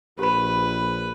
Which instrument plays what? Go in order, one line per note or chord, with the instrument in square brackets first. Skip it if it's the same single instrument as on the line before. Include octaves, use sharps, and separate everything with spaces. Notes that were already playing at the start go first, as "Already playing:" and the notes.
[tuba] A#1 [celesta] G4 B5 [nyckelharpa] B4